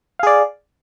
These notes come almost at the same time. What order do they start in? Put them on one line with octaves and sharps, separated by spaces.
F5 G#4 D5